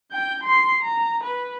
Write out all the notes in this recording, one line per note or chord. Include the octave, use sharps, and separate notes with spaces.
G5 G6
C6 C7
A#5
B4